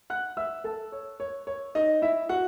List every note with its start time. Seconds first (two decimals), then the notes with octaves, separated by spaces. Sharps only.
0.10 F#5 F#6
0.37 E5 E6
0.64 A4 A5
0.92 C#5
1.20 C#5
1.47 C#5
1.75 D#4 D#5
2.02 E4 E5
2.29 F#4 F#5